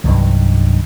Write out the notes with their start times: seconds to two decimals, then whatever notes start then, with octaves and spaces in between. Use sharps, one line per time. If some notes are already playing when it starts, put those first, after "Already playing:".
0.04 C2 G2 D#3 F#3